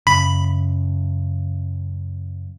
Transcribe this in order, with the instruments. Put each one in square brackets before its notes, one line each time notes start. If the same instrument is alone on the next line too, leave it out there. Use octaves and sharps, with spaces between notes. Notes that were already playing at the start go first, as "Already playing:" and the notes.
[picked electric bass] F#2 C#3 [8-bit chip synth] B5